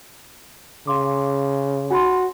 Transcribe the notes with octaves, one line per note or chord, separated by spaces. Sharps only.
C#3 F5 C6 D6
F#4 G#5 B5 C6